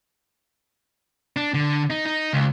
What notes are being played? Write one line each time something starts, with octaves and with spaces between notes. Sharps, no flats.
D4
D3
D#4
D#4
C#2